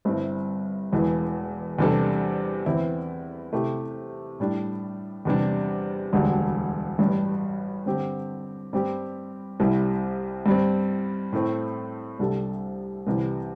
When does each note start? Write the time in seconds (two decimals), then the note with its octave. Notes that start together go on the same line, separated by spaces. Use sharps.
0.05 G1 G2 G3 C4 E4
0.92 E1 E2 E3
1.79 E2 C3 G3 D4 A4
2.66 E2 E3 C4 E4
3.53 C3 A3 E4 G4
4.40 A2 G3 D4
5.25 E2 C3 G3 D4
6.13 E1 D2 D3 G3
6.99 A1 G2 G3
7.86 G2 D3 C4 G4
8.73 G2 G3 C4 G4
9.60 C2 C3 G3 E4
10.46 G2 G3 C4
11.33 A2 A3 C4
12.19 C2 C3 G3 D4 A4
13.07 C2 C3 E3 G3